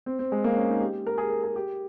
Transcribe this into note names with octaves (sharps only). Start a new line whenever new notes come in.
C4
C4
G#3
A#3
C#4
D#4
G4
A#4
G#4
A#4
G#4
G4